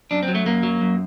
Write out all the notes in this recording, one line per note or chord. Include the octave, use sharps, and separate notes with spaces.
F#2 D4
C4
F#3
A3
F#2 A#3
F#3
F#2